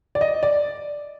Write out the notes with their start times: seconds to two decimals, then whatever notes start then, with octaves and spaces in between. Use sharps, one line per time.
0.15 D5
0.21 D#5
0.43 D5